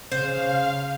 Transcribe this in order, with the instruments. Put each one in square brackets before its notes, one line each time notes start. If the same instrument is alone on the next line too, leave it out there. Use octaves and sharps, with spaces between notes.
[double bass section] C#3 [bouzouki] C5 [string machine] F5